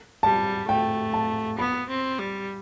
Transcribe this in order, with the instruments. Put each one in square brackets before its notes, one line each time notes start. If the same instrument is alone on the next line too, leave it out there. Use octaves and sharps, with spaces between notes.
[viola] G3 [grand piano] A5
[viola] A3 [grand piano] G5
[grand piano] A5
[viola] B3 [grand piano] B5
[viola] C4
G3